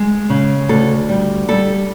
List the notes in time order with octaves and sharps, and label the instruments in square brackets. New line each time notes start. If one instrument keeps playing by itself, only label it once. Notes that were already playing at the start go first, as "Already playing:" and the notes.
Already playing: [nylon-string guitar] G#3
C#3
D2 A4
G3
G3 A4